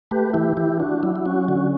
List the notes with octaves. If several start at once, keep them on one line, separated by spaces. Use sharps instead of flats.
A3 G4 B4
E3 E4 G4
E3 E4 G4
D4 F#4
F#3 E4
E4
C#4 F#4
D3 F#4